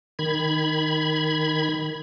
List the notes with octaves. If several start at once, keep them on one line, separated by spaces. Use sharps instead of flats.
D#3 B5 G#6